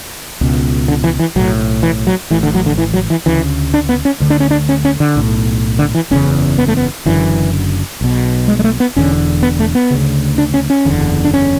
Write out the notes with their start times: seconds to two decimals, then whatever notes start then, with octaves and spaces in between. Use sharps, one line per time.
0.41 C#2 B2
0.88 D3
1.04 E3
1.19 E3
1.36 B1 A2 F#3
1.83 E3
2.07 F#3
2.30 A1 A2 E3
2.43 D3
2.54 F#3
2.66 D3
2.78 E3
2.94 F#3
3.10 E3
3.26 D2 C#3 E3
3.74 D4
3.89 B3
4.05 C#4
4.20 D2 D3
4.30 D4
4.40 C#4
4.51 D4
4.69 C#4
4.85 C#4
5.00 D3
5.16 B1 A2
5.79 D3
5.95 E3
6.11 F#1 E2 C#3 C#4
6.58 B3
6.68 A3
6.77 B3
7.06 F#1 F#2 D3 E3
8.01 B1 B2
8.48 G#3
8.59 G#3
8.64 A3
8.80 B3
8.96 E1 E2 D3 C#4
9.43 B3
9.60 A3
9.75 B3
9.90 D2 C#3
10.38 D4
10.54 C#4
10.70 C#4
10.85 F#1 E2 D3
11.25 D4
11.34 C#4